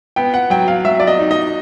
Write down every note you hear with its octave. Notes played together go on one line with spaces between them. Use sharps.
B3 G5
F#5
F#3 G5
F5
F#3 E5
D5
D#5
D#4
D#5